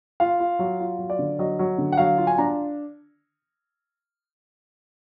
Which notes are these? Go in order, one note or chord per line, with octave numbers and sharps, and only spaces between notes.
F4 F5
F4
F#3
F4
F#3
D5
D3
F#3 D#5
F#3
D3
F#5
F#3 F5
F4
G#5
D4 A#5